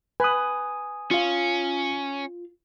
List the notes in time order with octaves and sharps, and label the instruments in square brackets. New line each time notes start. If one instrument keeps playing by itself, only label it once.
[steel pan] B4 [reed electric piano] G#5 D#6
[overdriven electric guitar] C#4 [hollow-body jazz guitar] F4 F5